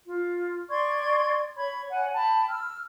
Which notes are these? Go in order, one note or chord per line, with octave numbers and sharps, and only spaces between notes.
F4
D5 C6 C#6 G#6
C#5 B5 G#6
C#5 F#5 G#5
G5 A5 B5
E6 F6